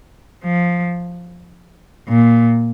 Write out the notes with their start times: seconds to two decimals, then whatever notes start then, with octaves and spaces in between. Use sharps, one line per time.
0.44 F3
2.08 A#2